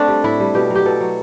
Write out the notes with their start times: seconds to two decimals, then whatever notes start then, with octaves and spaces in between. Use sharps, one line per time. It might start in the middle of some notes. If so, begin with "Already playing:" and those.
Already playing: A3 C4 D4
0.08 G3
0.24 A2 E4
0.40 G3
0.55 B2 G4
0.70 F#3
0.75 G4
0.85 B2 A4
1.01 F#3